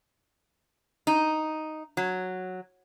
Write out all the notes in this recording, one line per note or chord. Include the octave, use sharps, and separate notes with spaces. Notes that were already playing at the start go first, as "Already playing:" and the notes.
D#4
F#3